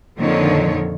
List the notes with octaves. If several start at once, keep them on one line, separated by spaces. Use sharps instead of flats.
F2 A#2 D3 D#3 F3 C#5